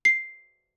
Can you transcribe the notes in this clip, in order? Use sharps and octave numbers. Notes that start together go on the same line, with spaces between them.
C7